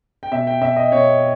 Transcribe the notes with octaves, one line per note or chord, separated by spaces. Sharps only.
G5
B2 E5
G5
B2 E5
D#5
B2 C#5